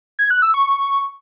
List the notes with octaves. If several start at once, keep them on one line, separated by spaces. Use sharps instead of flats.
G#6
F#6
E6
C#6